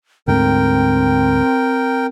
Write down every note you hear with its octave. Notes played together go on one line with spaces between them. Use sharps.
D2 G#2 A3 C4 A#4 G5